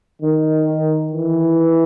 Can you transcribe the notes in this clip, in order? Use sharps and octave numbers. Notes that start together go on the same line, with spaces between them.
D#3
E3